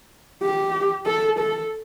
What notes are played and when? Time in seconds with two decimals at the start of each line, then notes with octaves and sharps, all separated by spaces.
0.42 G4
1.06 A4
1.39 A4